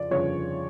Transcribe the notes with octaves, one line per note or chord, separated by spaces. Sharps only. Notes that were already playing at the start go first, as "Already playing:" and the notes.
Already playing: F2 C#3 D5
G1 F2 C#3 C#5